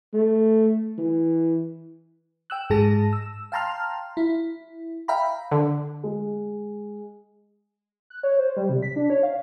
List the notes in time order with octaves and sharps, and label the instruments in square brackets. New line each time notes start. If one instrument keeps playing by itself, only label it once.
[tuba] A3
E3
[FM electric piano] G5 E6 F#6
G#2 G#3 G#4 A5 A#6
E6
F5 G5 A5 A#5 C6 F6
E4
E5 F5 G5 A#5 B5
[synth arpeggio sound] D3
[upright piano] G#3
[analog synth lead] F#6
C#5
C5
G3
C3
B6
D4
C#5
F5